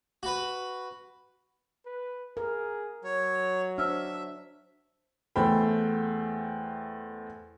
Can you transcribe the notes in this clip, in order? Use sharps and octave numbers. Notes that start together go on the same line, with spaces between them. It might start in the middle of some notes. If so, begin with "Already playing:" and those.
F#4 B4
B4
G#4 A#4
F#3 C#5
D4 C5 E5 E6 F6
E2 A3 C5 G5 B5